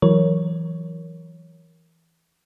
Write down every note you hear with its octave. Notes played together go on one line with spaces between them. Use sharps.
E3 F#3 A#4 C#5